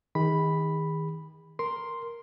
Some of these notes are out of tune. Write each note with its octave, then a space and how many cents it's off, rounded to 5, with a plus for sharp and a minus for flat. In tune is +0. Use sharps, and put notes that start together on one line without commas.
D#3 +30 G#4 -35 B5 +0
A#4 +0 C6 +0